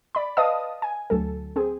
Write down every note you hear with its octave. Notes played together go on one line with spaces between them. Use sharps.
D5 B5
B4 D5 D#5 F5 A5 D#6
G#5
D2 F#3 A4
C4 G#4